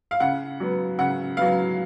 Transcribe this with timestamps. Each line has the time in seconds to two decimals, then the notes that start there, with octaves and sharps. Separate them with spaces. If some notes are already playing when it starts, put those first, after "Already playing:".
0.11 F5
0.20 C#3 F#5
0.60 F#3 B3
0.99 C#3 F#5
1.37 F#3 B3 F5